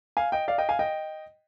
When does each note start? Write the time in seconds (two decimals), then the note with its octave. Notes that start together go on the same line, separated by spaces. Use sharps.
0.17 F5 G#5
0.32 D#5 G5
0.48 D5 F5
0.58 D#5 G5
0.69 F5 G#5
0.79 D#5 G5